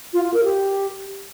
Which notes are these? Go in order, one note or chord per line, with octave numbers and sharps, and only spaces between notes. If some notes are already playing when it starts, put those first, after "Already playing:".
F4
F4
A#4
G4